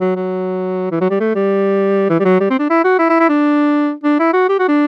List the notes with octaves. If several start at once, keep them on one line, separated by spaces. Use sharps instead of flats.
F#3
F#3
E3
F#3
G3
A3
G3
E3
G3
F#3
G3
C4
D4
E4
F#4
E4
E4
E4
D4
D4
E4
F#4
G4
F#4
D4